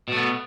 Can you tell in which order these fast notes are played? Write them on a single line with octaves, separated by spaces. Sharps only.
B2 A3 B3